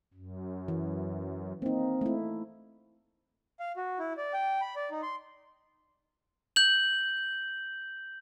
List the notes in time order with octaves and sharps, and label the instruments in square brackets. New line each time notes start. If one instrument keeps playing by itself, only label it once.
[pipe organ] F#2
[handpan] E3
[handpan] A#3 D#4 [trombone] C4
[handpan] A3 E4
[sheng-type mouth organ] F5
F#4
E4
D5
G5
B5
D5
D#4
C6
[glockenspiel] G6 F#7